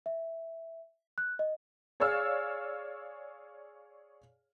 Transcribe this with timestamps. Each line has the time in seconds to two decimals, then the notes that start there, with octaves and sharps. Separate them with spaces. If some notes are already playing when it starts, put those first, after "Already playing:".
0.06 E5
1.18 F#6
1.39 D#5
2.00 G#4 C#5 D5 F5 E6 F6